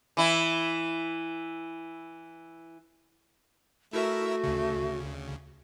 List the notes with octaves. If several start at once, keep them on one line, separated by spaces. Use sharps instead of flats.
E3 E4
A3 E4 F#4 A#4 E5
D2 C#3